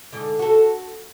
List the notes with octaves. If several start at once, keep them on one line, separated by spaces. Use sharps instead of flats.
G#2 D3
F#4 A4